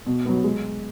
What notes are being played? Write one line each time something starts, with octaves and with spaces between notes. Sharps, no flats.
B2
F#3 B3
G#3